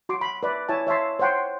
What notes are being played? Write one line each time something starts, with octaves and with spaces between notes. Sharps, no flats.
F#4 C6 D6
B5
B4 D5 E5
E4 C#5 E5 G#5 A5
C#5 E5 A5 C6
C5 C#5 F#5 G5 C6